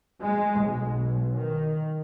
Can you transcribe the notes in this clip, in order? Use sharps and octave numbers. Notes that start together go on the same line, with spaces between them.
G#3
B1
D#3